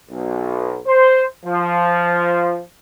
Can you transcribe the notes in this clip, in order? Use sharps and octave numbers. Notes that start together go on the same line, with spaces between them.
B1
C5
F3